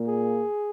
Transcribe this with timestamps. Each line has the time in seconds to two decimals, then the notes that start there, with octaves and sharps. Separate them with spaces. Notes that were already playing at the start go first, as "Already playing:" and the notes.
Already playing: A#2 A#3
0.08 G#4